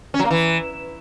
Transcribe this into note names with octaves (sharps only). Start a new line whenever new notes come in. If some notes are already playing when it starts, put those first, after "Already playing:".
C#4
F#3
A#3
E3